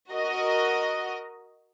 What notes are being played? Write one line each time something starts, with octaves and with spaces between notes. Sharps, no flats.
F#4 A#4 D#5